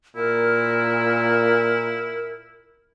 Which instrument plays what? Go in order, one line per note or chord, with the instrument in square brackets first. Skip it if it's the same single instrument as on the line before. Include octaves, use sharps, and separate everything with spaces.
[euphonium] A#2 [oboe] E4 [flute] A#4